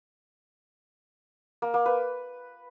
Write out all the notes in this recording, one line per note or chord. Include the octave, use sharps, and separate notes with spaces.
A#3
A#3
B4